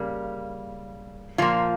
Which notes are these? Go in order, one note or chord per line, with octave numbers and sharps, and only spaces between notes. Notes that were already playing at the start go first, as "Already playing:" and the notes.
Already playing: C#3 G3 A#3
A#2 F3 A#3 F4